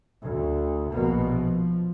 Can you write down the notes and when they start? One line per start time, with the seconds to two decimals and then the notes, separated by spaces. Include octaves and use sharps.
0.23 D2
0.91 A#1 B2 A#3
1.21 F3